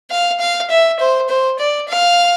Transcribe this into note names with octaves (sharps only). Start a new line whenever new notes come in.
F5
F5
E5
C5
C5
D5
F5